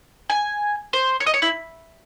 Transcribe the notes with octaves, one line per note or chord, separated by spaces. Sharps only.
G#5
C5
C#5
D#5
C#5
E4